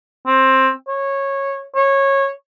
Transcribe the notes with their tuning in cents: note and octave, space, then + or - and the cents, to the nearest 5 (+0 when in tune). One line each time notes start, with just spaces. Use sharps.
C4 +15
C#5 -15
C#5 -15